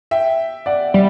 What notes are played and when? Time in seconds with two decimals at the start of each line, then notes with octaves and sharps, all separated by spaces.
0.11 E5 G5
0.66 D5 F#5
0.94 G3